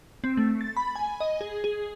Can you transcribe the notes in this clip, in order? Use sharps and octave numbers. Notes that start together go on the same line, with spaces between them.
C4
A3
A6
B5
G#5
D#5
G#4
G#4